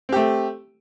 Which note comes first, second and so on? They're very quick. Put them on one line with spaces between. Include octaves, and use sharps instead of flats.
C4 G4 A3